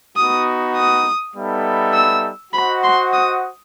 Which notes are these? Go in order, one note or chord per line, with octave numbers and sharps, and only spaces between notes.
B3 D#4 F#4 D#6
D#6
G3 B3 D#4 A4 E5
E6
F#4 C5 D#5 F#5 B5
C6
D#6